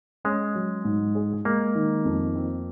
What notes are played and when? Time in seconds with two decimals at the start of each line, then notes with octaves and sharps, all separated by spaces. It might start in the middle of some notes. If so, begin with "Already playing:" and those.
0.25 G#3 C#4
0.55 F#3
0.85 G#2
1.15 G#4
1.45 G#3 A#3
1.75 D#3
2.05 F2
2.35 C4